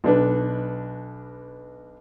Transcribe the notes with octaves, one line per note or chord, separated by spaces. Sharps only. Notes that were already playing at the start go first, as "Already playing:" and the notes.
B1 D4 B4